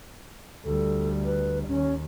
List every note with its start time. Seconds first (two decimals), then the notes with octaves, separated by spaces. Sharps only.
0.65 D2 G3 A4
1.25 B4
1.68 D#2 C#4